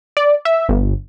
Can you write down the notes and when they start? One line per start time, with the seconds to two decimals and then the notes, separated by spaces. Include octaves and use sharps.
0.17 D5
0.45 E5
0.69 G1